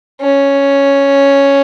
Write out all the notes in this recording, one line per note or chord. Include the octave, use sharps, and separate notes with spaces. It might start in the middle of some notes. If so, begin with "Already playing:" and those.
C#4